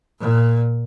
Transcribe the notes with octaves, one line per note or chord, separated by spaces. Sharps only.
A#2